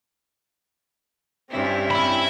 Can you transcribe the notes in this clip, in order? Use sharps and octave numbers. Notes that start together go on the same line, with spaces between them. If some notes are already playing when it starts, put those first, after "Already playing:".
G2 C4 C#4 E4
C4 C#4 E5 B5